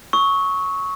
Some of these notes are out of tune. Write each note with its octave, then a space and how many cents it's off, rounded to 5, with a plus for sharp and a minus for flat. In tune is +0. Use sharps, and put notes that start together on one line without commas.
C#6 +0 E6 -35